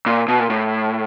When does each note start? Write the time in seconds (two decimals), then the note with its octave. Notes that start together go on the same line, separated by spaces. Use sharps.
0.06 A#2
0.28 B2
0.39 A#2
0.50 A2